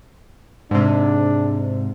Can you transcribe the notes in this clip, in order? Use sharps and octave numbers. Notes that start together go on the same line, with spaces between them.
G#2 C3 D4